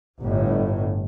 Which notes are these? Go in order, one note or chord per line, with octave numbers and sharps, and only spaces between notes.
G1 A2